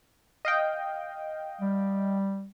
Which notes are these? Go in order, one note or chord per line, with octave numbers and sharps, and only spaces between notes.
D#5 F5 G5
G3